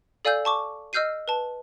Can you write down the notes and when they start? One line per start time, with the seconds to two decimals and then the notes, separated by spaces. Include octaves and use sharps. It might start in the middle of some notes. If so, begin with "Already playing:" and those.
0.25 A4 D5 F5 G#5 E6 G6
0.45 A5 C#6 D6
0.93 D#5 E6 F6 G6 C7 D#7
1.28 B4 A5